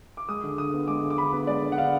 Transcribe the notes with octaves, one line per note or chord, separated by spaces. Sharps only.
D6
G#3 D#6
D3
D3 D#6
B3
G#3 D6
D3
D6
D3 B5
B3
G#3 D5
D3
F#5
D3 F5